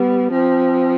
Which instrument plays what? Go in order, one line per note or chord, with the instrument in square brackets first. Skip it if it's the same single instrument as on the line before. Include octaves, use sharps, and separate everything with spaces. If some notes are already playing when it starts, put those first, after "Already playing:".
Already playing: [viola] G3 [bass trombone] B3
[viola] F3 [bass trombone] C4